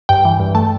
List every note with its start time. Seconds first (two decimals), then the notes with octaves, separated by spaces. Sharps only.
0.09 G2 G5
0.25 E3
0.40 G2
0.55 A3 A5